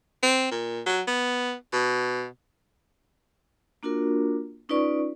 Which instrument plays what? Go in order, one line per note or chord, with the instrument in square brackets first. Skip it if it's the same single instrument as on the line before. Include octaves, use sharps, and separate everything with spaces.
[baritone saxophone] C4
A#2
F#3
B3
B2
[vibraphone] A#3 D4 F4 F#4 A#4
C#4 D#4 F4 B4 D5 C#6